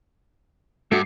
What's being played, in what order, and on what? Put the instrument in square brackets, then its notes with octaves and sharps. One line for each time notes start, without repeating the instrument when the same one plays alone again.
[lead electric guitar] G2 [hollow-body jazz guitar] A3 F#4